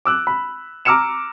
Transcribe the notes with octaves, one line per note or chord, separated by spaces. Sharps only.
D6 E6 F#6
B5
A#5 D6 E6 F6 C#7 E7